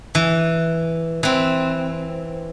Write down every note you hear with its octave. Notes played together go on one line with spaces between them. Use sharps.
E3
E3 C4